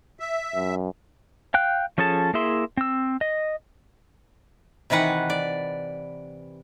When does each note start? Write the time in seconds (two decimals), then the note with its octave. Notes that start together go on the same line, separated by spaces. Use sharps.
0.20 E5
0.55 F#2
1.54 F5 G5 F#6
1.98 F3 C#4 G#4 A4 A5
2.34 A#3 E4 G#4 E5 C6
2.77 C4 E6
3.21 D#5
4.90 C3 D#3 E3 B4 F#5
5.30 D5